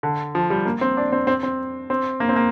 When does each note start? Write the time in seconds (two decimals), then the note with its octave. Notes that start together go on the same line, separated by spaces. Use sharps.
0.03 D3
0.35 F3
0.50 G3
0.66 A#3
0.81 C4
0.97 D4
1.12 C4
1.27 C4
1.43 C4
1.90 C4
2.20 A#3
2.29 C4
2.36 A#3